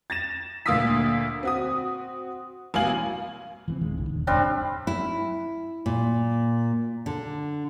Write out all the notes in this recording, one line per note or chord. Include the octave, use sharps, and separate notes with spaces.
A6 A#6 E7
D2 A#2 F5 D#6 E6 B6
C4 F#4 D#6
A1 B2 F5 G#5 F#7
E3 G#3 C4
D#1 D#3 G#3
C2 A2 D3
D#1
F1 G#2 G3 C4 D4
E4
A#2
D3